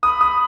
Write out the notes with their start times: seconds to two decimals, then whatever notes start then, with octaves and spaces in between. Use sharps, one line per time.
0.03 B5 D#6
0.21 D#6